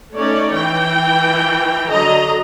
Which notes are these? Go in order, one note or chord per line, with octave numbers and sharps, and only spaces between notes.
A3 C#4 D#4 C#5 D5
E3 G5
D3 F#3 A4 D#5 A#5